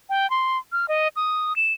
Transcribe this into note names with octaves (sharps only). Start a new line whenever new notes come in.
G5
C6
F6
D#5
D#6
E7